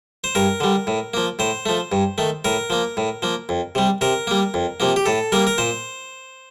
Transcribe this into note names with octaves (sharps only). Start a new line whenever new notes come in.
C5
G2 A#4
D3 G3
A2
F3 A#3
A2 C5
F3 A3
G2
D#3 A3
A2 A#4
F3 A#3
A2
F3 A#3
F2
C3 G3
C3 A#4
G3 A#3
F2
C3 F3 A#3
G4
A2 A4
G3 A#3 A#4
A#4
A#2 C5